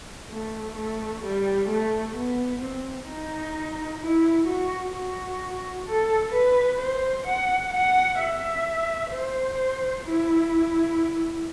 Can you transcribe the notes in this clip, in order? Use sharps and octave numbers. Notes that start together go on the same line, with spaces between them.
A3
A3
G3
A3
B3
C4
D#4
E4
F#4
F#4
A4
B4
C5
F#5
F#5
E5
C5
E4